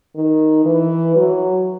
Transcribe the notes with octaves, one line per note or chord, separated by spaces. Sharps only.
D#3
E3
F#3